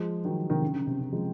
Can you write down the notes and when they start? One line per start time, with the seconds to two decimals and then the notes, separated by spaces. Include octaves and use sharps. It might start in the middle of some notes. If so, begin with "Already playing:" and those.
Already playing: F3 G#3
0.25 D#3 F#3
0.50 C3 D#3
0.62 C#3
0.74 C#3
0.87 C3
1.00 C#3
1.12 F3 G#3